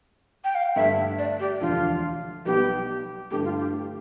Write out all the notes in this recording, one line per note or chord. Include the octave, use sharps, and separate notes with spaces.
G5
F5
G2 D3 A3 E5
D5
G4
E1 D2 D3 F3 F4
B1 B2 G3 B3 G4
G2 D3 A3 E4 G4
F4
G4